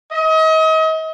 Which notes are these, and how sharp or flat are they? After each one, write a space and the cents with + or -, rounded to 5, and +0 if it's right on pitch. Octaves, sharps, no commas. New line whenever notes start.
D#5 +35